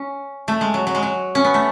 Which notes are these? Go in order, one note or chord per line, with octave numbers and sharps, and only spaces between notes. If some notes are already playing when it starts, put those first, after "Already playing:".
Already playing: C#4
A3
G#3
F#3
F#3
G#3
F#3
C#4
B3
A3